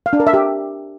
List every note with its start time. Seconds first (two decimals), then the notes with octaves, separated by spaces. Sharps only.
0.06 F5
0.13 D4
0.20 A#4
0.27 E5
0.34 G4